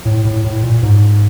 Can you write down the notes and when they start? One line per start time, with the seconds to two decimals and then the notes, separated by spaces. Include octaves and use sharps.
0.06 A2
0.25 A2
0.44 A2
0.63 A#2
0.83 G#2